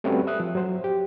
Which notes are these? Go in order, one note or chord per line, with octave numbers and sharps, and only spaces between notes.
G3 A3 C4 C#4 F#4 B4
E5 D#6 F#6
F3
F#3 C5
G4